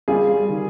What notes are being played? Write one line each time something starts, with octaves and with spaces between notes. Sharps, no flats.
G3 F4 G#4
D#3